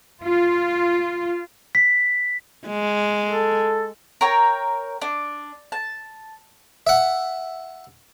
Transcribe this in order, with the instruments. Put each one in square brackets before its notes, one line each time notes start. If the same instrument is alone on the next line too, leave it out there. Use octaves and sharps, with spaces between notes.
[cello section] F4
[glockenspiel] B6
[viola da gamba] G#3
[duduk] A4
[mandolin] A#4 C#5 G5
D4
A5
[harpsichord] E5 F#5